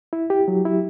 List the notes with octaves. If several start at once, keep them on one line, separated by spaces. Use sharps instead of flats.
E4
G4
F#3
E4